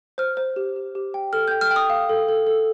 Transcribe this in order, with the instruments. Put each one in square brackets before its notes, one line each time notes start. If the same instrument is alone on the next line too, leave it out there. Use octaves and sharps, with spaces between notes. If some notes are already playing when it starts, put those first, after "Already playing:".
[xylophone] C5 F6
C5
G4
G4
G4
G5
A4 F6
G5 G6
F6
G5
D#6
F5
A4
A4
A4